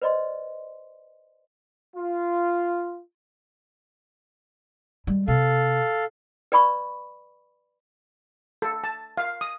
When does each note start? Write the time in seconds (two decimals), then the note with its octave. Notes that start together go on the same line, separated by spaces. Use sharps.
0.02 B4 C5 D5 D#5 C6
1.95 F4
5.07 G3 G#3
5.28 C3 A4 F5
6.52 B4 D5 B5 C#6
8.62 A4
8.84 A5
9.17 F5
9.41 D#6